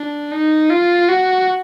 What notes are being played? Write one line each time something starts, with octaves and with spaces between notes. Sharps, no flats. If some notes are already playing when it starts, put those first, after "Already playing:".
Already playing: D4
D#4
F4
F#4